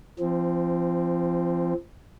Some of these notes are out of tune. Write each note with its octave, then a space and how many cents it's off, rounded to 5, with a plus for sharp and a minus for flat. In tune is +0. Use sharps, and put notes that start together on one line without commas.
F3 -30 C4 +0